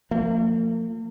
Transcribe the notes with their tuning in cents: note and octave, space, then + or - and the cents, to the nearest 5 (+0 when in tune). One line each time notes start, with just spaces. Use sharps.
F3 +0 A#3 -45